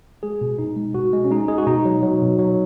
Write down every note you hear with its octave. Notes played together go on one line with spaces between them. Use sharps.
G#3 G#4
B2
B2 D#4
G#3
B2 F#4
G#3
C#4
G#3 D#4
G#3 G#4
F#4
B2 D#4
F#3
F#3
B2
F#3